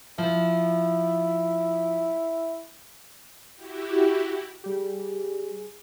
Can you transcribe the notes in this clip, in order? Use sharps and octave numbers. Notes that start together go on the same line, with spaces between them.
F3 E4
E4 F#4 G4
G3 G4 G#4